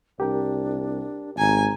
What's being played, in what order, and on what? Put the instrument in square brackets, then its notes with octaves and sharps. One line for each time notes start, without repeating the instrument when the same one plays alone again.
[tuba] C2 [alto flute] D4 [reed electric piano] G4 A#4 G5
[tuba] G#1 [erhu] G#5 [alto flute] A#5